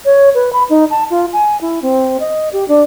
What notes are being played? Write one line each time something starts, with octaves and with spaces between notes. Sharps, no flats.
C#5
B4
B5
D#4
A5
F4
G#5
E4
C4
D#5
G4
D4